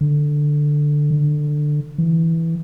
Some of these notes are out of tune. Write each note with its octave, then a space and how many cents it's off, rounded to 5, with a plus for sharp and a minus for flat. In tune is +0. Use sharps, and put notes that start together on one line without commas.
D3 +5
D3 +15
E3 -5